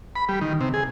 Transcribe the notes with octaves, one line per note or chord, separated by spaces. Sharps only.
B5
G3
D#3
C3
G#4